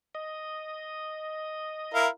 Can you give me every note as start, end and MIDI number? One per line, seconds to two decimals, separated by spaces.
0.15 2.02 75
1.94 2.08 64
1.94 2.08 70
1.94 2.08 77